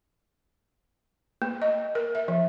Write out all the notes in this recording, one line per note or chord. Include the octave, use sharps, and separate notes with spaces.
A#3
D#5
A#4
E5
F3